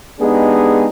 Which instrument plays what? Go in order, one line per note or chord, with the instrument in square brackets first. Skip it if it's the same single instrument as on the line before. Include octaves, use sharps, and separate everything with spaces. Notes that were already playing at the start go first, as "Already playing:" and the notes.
[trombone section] G#3 B3 D4 D#4 G4 G#4